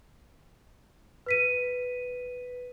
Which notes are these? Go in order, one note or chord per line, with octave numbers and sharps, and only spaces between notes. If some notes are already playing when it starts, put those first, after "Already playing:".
B4 B6 D#7